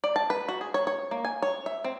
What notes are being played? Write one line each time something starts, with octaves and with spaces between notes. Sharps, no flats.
D5
A5
B4
F#4
G#4
C#5
C#5
A#3
G#5
C#5
E5
C4